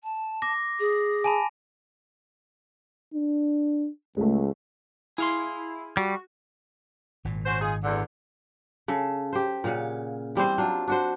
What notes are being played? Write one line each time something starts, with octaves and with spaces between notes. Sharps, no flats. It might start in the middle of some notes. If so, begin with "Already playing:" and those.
A5
D6 A#6
G#4
G#5 A5 B5
D4
C#2 G#3 A3
E4 G#4 F5 C6
G3 F#4
G#1 A#2
C#4 F#4 C5
D#4 F4 G#4
E2 D3
C#3 A4
G4 C5
A#2 C#3 F5 F#5
E3 G3 C4 C5
F#3 D4 F4
D4 F#4 C5